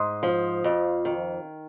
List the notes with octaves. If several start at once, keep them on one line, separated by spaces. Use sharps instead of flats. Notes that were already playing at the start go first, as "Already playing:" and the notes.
Already playing: G#2 C6 D#6
F3
F2
D#3